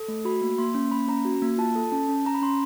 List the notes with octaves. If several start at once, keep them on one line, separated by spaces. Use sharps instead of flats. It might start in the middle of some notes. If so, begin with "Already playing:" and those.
Already playing: A4
A3
F#4 B5
A#3
A#3 C6
C#4
A#3 B5
C#4 A#5
F#4
A#3
F4 A5
A4
C#4 A5
C#4
C#4 A#5
B5
C#4 C6